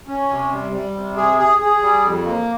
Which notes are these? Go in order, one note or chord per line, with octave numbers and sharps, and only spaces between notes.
C#4
C3
G3
G3
C3
G#4
G#4
G#4
G3
F2
A#3